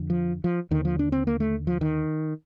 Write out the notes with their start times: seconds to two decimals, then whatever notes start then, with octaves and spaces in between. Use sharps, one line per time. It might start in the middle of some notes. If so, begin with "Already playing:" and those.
Already playing: F2 D3
0.10 F3
0.44 F3
0.71 D#2 D3 D#3
0.85 F3
0.99 D4
1.12 C4
1.27 A#3
1.40 A3
1.67 F3
1.81 D#3